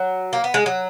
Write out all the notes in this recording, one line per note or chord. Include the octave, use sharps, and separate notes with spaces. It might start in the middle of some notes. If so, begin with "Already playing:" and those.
Already playing: F#3
A#3
B3
G#3
F#3